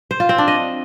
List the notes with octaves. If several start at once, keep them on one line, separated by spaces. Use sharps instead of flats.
C5
F4
C4
D4
D#5